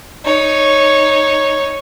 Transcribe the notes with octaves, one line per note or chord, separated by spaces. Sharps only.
D#4 C#5